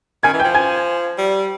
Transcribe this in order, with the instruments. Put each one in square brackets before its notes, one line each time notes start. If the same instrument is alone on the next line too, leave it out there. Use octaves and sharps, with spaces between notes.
[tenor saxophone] D#3 [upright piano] G#5 G#6
[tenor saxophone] E3
[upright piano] G5 G6
[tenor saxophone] F3
[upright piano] G#5 G#6
[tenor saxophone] G3